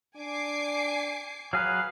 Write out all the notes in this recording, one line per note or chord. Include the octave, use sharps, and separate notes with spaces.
D4 G#5 D6 C7
F#3 G#4 B4 F5